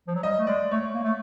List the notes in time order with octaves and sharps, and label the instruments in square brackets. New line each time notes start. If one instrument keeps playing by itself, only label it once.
[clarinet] F3
F#3
[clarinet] G3 [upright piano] D#5
[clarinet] A3
[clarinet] G#3 [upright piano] D5
[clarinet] A3 [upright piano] C#5
[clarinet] A#3
A3